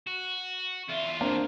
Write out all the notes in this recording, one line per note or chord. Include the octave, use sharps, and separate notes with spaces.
F#4
E2 F4 E5
A#3 C4 D4